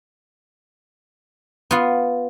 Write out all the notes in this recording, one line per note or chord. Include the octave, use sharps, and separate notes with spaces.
B3 F4